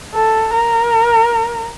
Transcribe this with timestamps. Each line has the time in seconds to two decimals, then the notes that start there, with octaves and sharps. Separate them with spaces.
0.15 A4
0.53 A#4